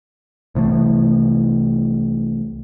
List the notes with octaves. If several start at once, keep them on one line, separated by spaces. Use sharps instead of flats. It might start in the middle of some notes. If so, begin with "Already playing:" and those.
C2 C3 E3 A3